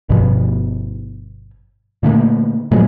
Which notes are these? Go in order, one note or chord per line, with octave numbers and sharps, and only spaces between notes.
G1 G2 B2 F3
A#2 D3 A3 A#3
A#2 F3 F#3 G#3